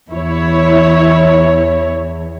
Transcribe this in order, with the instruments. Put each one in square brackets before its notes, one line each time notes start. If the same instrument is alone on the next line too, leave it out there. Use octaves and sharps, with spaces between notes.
[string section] E2 [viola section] E4 C#5